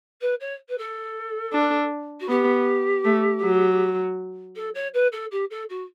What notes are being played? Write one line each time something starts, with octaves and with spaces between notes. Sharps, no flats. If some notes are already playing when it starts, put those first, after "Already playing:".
B4
C#5
B4
A4
D4
F#4
B3 G4
A3
F#3
A4
C#5
B4
A4
G4
A4
F#4